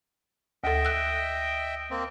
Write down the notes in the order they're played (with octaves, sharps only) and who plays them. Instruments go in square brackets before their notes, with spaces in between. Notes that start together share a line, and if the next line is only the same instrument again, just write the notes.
[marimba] D2 A4 [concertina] D#5 E5 G5
[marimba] E6 F#6
[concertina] A#3 C4